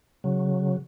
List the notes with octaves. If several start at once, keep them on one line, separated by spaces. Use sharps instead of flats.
C#3 F#3